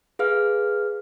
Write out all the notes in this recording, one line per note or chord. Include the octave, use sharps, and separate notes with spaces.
G#4 B4 F5 F6